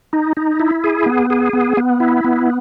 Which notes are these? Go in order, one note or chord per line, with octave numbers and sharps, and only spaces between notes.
D#4
D#4
E4
G#4
B3
G#4
B3
B3
E4
B3